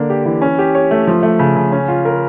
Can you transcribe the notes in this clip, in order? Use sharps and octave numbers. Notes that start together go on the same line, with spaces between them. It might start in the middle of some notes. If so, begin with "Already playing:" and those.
Already playing: D3 A#3 D4
G4
E3
C#4
G4
C#5
A3
F3
A3
C#3
C#3
C#4
F4
A#4